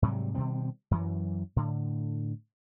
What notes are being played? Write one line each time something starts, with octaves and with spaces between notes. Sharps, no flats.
G#2 C3 F#3 G3
B2 D#3 G3 C4
F#2 E3 F#3
A2 D3